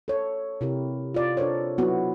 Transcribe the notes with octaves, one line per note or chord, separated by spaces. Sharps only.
A4 C#5
C3 E4 G4 A#4
F4 D5
D4 A4 A#4 C5 C#5
F#3 B3 E4 F#4